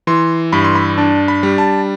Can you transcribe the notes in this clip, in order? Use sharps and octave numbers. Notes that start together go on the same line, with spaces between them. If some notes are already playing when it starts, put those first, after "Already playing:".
E3 C6
G2 B5
C6
B5
D4 A5
B5
G3
A5